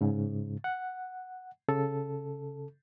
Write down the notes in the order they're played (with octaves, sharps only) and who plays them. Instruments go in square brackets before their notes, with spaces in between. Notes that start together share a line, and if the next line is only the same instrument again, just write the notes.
[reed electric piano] G#2 C#3
F#5
C#3 A4